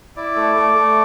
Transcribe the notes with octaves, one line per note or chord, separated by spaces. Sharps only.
E4 D5
A3
A3
A3